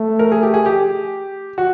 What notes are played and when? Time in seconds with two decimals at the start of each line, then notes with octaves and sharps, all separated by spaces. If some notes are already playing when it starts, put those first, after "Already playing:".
Already playing: A3
0.19 A#4
0.32 G#4
0.43 G4
0.54 G#4
0.66 G4
1.58 F#4